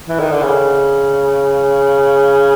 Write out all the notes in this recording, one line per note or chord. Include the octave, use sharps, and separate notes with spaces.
E3
D#3
D3
C#3